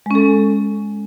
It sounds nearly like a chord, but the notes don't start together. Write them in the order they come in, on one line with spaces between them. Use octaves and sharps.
G#3 C#4 A4